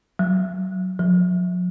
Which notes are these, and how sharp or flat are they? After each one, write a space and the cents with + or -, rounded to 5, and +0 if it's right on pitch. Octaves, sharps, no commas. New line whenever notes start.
F#3 +0
F#3 -45